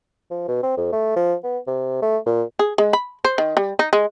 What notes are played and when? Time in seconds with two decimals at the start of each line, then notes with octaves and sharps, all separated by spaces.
0.30 F3
0.48 B2
0.63 C4
0.77 F2
0.92 A3
1.16 F3
1.43 B3
1.67 C3
2.02 A3
2.26 A#2
2.59 G#4
2.78 G#3
2.93 B5
3.25 C5
3.38 D#3
3.57 G3
3.79 D#4
3.93 G#3